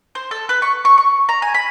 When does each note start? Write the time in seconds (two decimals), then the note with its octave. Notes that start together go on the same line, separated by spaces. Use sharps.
0.15 C5
0.31 A4
0.49 B4
0.62 C#6
0.85 C#6
0.98 C#6
1.29 A#5
1.42 G#5
1.54 B5